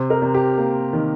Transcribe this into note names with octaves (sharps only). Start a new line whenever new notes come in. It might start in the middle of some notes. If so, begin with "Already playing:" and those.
Already playing: C3 C5
A#4
C3
G4
A#3
D#3